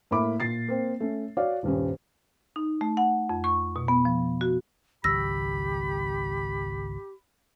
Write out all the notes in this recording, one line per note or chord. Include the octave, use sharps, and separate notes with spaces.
A2 A#3 E4 B5 D6
A#2 A6 C7
A#3 C4
A3 C#4
F#4 C#5 D5 F5
D#1 G2 C#4
D#4
A3
F#5
F2
C#6
B2
B3
F3
F#4
G#1 C#2 F#3 G4 B5 E6 A#6